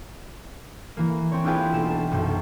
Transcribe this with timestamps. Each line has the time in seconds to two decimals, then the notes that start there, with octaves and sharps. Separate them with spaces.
0.97 E3 A#3
1.32 C4 C#5
1.44 D4 E4 F4 G4 G#4 B4
1.72 B1 A#3 E7
1.85 G4 A5
2.11 B1 F#2 C3